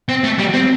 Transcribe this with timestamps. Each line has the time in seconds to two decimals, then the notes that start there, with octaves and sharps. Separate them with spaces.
0.09 C4
0.24 A3
0.39 G3
0.53 C4